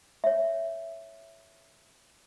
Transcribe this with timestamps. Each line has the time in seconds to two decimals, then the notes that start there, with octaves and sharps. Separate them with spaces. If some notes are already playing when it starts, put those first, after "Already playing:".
0.24 C#5 E5